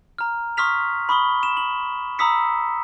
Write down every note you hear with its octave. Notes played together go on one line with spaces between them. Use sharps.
A#5 F6
C6 C#6 D#6 F6 B6 F7
B5 C#6 D#6 G7
E7
F#7
A#5 B5 D#6 E6 B6 C#7